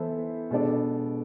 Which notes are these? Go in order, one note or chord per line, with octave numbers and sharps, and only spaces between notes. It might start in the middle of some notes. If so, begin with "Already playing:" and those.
Already playing: E3 B3 E4 A4 C5
B2 G#3 D4 A4 D5